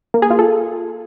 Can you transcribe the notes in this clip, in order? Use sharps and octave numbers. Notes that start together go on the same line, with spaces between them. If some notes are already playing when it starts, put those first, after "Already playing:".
A#3
G#4
F4
A4